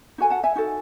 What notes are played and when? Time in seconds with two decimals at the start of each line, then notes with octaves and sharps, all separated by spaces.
0.18 D#4 F#4 A4 G#5
0.30 F#5 A5
0.44 E5 G#5
0.55 D#4 F#4 A4